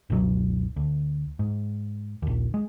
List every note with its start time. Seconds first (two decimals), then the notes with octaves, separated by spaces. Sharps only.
0.10 F#1 C#2 B2 F#3
0.76 D2
1.39 G#2
2.22 A#1 D#2
2.54 G#3